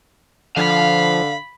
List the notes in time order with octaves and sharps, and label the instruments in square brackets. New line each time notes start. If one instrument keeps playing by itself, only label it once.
[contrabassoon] D3 [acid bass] F3 [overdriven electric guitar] F5 [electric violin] B5